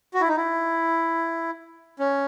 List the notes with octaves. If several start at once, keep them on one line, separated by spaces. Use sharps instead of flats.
F#4
E4
D#4
E4
C#4